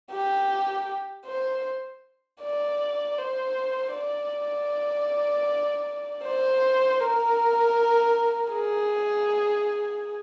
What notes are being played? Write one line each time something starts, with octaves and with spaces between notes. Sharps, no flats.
G4
C5
D5
C5
D5
C5
A#4
G#4